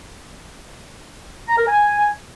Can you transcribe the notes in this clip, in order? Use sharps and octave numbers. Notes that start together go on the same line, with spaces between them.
A#5
A#4
G#5